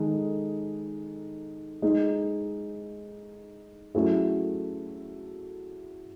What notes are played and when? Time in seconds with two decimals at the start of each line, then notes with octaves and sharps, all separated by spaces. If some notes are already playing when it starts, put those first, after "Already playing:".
Already playing: D#3 G#3 D#4 A4
1.82 G#3 D#4 G#4
3.95 F#3 A3 C#4 E4 G#4